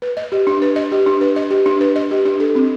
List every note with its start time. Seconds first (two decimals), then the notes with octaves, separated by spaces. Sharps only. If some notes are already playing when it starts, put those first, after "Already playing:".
0.02 B4
0.17 D#5
0.32 G4
0.47 D4
0.62 B4
0.76 D#5
0.92 G4
1.06 D4
1.21 B4
1.36 D#5
1.51 G4
1.66 D4
1.81 B4
1.96 D#5
2.11 G4
2.26 D4
2.40 A4
2.55 C4